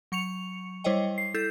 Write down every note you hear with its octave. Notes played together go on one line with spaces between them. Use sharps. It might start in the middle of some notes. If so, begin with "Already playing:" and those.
F#3 C#6 C#7 F7
G3 E4 C5 C#5 D#5 G5
C7
E4 A4 G6 C7 E7